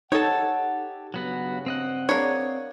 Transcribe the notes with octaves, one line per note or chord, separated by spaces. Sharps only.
D#4 G4 A4 C#5 F#5 A5
G2 C#3 F#3 B3 F#4
C4 D#5 F#5
A#3 D4 G#4 C#5 D5